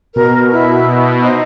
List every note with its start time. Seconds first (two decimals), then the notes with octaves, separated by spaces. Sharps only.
0.16 B2 A#4
0.52 E4
1.22 D#4 C5 D#5